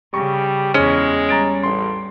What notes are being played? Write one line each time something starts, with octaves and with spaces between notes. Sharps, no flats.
C#3 G3 C#6
E2 G#3 C#4
G3 A#5 A6 D7
A1 C6